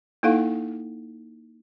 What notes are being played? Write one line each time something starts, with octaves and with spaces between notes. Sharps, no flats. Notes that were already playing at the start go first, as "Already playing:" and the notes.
A#3 D#4 E4 A4 F5 F#5